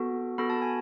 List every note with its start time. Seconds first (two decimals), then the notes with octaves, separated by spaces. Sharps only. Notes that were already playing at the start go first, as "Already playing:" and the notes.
Already playing: B3 F#4 A4
0.38 B3 F#4 A4 B5
0.50 A5
0.62 G#5